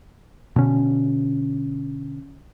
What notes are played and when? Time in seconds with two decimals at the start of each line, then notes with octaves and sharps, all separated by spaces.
0.56 B2 D3 C#4